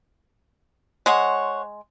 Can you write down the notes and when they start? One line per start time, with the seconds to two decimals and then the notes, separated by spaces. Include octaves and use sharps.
1.06 G#3 C5 C#5 F#5